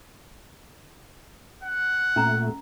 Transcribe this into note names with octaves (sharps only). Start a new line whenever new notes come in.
F#5
A#2 A3 C#4 A#5